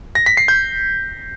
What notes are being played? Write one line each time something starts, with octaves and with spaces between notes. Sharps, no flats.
A#6
B6
C7
G6